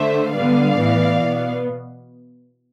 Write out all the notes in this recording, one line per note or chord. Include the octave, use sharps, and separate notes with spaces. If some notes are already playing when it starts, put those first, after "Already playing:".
Already playing: D3 A3 C5 E5
D3 G3 B3 D5 F5
A2 E3 B3
B2 B3